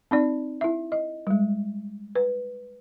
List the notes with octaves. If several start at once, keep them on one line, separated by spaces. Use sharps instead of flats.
C4 D#4 D5
E4 E5
D#5
G3 G#3
B4